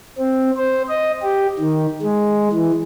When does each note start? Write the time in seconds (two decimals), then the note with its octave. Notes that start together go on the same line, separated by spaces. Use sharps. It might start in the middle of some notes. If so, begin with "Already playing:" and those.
0.18 C4
0.57 C5
0.89 D#5
1.23 G4
1.59 D#3
2.03 G#3
2.52 E3